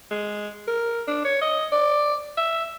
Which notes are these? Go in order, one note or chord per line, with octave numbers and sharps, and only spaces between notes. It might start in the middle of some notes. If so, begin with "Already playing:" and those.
G#3
A#4
D4
C#5
D#5
D5
E5